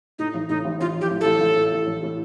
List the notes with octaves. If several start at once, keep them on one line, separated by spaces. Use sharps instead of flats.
A2 D#4
A1
A2 D#4
A1
A1 F4
F3
G4
A1
A1 A4
A1
A2
A2
A1
A2